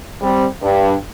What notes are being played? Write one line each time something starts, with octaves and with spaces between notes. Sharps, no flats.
G3 C4
G2